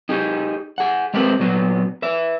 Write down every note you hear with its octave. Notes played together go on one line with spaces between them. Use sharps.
D#4 G4 G#4
G#4 F#5
G#3 A3 C4 G4 A#4 B4
A#2 F#3 B3
B4 E5